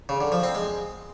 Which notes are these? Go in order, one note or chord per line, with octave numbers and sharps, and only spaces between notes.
C#3
D3
F3
C4
G#3